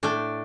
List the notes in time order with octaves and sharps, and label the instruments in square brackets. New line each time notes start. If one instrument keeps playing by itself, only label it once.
[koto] A2 A3 D4